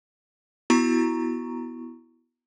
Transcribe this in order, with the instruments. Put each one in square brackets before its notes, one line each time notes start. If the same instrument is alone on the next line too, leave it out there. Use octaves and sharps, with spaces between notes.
[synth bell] B3 E4 F#4 A#5 C#6